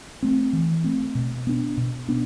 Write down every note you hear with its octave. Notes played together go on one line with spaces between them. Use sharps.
A3 C4
E3
A3 C4
B2
B3 D4
B2
B3 D4